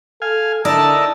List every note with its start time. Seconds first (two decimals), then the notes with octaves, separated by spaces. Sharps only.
0.22 A4 F5 G#5
0.65 D3 D#4 E4 A#4 D5 A5